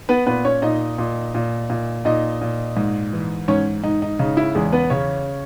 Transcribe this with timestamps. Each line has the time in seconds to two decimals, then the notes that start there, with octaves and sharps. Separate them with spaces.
0.09 B3 B4
0.26 A#2 B3 B4
0.45 C#4 C#5
0.62 A#2 D#4 D#5
0.98 A#2
1.35 A#2
1.70 A#2
2.05 A#2 D#4 D#5
2.42 A#2
2.77 G#2
3.13 E3
3.48 G#2 C#4 C#5
3.84 G#2 D#4
4.02 D#4
4.19 C#3 D#4
4.37 E4
4.55 E2 G#3 G#4
4.72 B3 B4
4.90 C#3 C#4 C#5